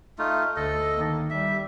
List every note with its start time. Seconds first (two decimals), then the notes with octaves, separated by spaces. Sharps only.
0.19 A3 D#4 F4
0.56 D2 A3 A4 D#5
0.94 D#3 A#3
1.30 G3 E5